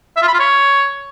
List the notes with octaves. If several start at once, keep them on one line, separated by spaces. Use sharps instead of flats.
E5
F4
B5
F4
C#5